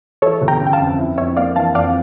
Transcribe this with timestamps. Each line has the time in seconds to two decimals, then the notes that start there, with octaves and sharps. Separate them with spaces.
0.22 E3 A4 C#5
0.41 G1
0.48 G5 A#5
0.61 C#3
0.67 G5
0.73 F5 A5
0.79 F2
0.98 E4
1.18 F2 C#5 E5
1.37 A#3 D5 F5
1.56 E3 F5 A5
1.75 F2 D5 F5